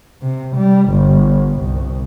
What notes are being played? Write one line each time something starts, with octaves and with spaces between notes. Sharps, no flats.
C3
G3
G1
C2